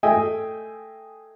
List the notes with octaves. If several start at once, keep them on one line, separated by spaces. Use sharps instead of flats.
A3 G#4 D#5 E5 G5 G#5